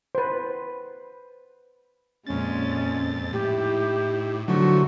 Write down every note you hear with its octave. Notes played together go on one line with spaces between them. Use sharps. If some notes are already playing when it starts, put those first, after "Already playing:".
B4 C5
F2 A#2 G#3 C#4 A6
A2 D#4 E4 G4
D3 F3 F#3 A3 F#4